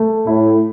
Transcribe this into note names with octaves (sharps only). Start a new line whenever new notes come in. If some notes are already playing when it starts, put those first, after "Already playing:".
Already playing: A3
A2 E4